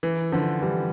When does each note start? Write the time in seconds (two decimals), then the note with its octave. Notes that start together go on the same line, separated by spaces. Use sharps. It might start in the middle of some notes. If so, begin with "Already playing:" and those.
0.03 E3
0.32 D3 F3
0.61 E3 G3